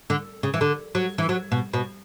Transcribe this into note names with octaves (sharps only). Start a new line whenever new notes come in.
D3
C#3
E3
D3
F#3
E3
F#3
B2
B2